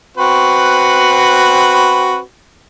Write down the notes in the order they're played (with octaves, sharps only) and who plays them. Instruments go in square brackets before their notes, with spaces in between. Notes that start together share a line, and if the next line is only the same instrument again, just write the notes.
[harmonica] C4 F#4 B4